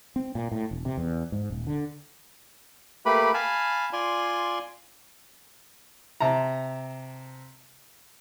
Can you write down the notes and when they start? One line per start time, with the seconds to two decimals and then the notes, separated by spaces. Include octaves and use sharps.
0.16 C4
0.35 A#2
0.52 A2
0.71 E1
0.85 C3
0.97 E2
1.32 G#2
1.50 D#1
1.67 D3
3.06 A3 A#3 G4 B4 B5
3.34 F5 G#5 A5 B5
3.93 F4 D5 G#5 C6
6.20 C3 A5 A#5